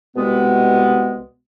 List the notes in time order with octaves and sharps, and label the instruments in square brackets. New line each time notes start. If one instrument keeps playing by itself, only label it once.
[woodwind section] C2 B2 G#3 B3